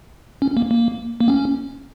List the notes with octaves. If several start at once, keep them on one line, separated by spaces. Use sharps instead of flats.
C#4
A#3
A#3
A#3
C#4